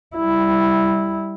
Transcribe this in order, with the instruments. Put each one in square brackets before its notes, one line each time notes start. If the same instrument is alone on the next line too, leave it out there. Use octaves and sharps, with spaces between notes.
[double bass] G3 E4